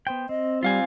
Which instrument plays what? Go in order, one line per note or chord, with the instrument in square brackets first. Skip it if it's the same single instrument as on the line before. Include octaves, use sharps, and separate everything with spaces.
[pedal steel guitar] B3 C5 G5
[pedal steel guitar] C4 [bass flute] D#5
[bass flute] G3 [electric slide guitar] F4 F5 G#5